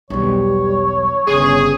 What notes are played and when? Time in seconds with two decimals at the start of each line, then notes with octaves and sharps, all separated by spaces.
0.10 B1 E2 G3 C#5
1.28 G1 C#3 G#4